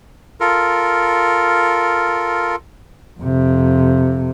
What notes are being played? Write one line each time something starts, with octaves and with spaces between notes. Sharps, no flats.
F4 A4 A#4
F2 C3